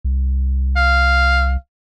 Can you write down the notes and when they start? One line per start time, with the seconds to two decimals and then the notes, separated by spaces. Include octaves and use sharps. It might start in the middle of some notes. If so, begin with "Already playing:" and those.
0.04 C2
0.76 F5